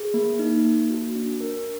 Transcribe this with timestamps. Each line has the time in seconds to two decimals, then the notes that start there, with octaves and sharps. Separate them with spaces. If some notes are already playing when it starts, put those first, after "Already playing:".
Already playing: G#4
0.14 A#3
0.39 D#4
0.64 A#3
0.90 F#4
1.15 D4
1.40 A#4